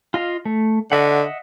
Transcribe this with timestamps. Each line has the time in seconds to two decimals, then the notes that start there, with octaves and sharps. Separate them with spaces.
0.14 F4 D#5 F5
0.45 A3
0.92 D3 D#5 E5 F#5